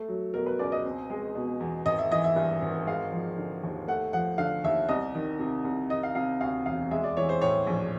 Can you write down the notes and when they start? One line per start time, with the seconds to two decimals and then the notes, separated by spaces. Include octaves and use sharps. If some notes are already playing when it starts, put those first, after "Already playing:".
Already playing: A3
0.09 F#3
0.34 B2 A#4
0.46 B4
0.59 C#2 D5
0.72 D#5
0.85 C4
1.10 G#3
1.35 B2
1.60 E2
1.85 G#1 D#5
1.98 E5
2.11 E3 D#5
2.24 E5
2.36 G2
2.62 G#1
2.87 G#3 F5
3.12 F3
3.38 D3
3.63 D#2
3.88 A3 F#5
4.13 F3 F#5
4.38 D3 F5
4.64 D#2 E5
4.89 C2 D#5
5.15 D#3
5.39 C3
5.65 C2
5.90 D#3 D#5
6.03 F5
6.15 C3 F5
6.40 D2 F5
6.66 E1 F5
6.91 G#3 E5
7.04 D5
7.17 E3 C#5
7.29 C5
7.41 A2 C#5
7.67 A#1